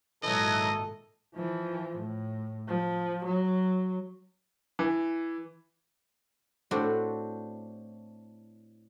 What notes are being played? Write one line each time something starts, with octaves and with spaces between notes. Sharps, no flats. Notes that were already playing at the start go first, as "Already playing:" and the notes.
G#1 A#2 E3 F#3 G#3 A4 D#5
E3 F3
A2
F3
F#3
E3
A2 A3 C4 D4 F#4 D5